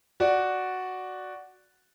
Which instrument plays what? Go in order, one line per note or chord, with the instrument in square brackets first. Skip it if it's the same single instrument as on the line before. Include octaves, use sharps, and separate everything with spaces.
[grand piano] F#4 D5